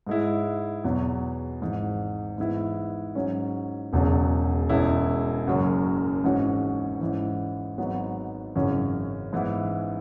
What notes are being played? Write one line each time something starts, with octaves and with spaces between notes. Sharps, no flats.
G#2 G#3 E4
E2 B2 F#3 B3
G#1 G#2 E3
G#2 E3 B3 E4
G#2 F#3 C#4
E1 E2 C#3 F#3
E1 E2 E3 C#4 E4
F#1 F#2 F#3
G#1 G#2 E3 C#4 F#4
G#2 E3 C#4 E4
G#1 G#2 F#3 B3
G#1 F#2 C#3 E3 C#4
G#2 E3 B3 E4